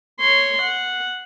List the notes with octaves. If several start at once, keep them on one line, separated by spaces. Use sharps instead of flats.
C#5 C6
F#5